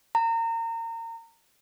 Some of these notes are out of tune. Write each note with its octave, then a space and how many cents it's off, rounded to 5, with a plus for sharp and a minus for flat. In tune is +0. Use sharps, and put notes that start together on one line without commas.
A#5 -30